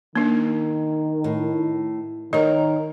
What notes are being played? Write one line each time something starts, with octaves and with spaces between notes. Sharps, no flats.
D#3 A#3 D4
A2
D#3 A#4 C#5 D#5